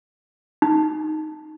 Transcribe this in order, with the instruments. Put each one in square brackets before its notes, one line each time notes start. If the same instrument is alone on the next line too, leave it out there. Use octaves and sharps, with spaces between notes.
[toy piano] D#4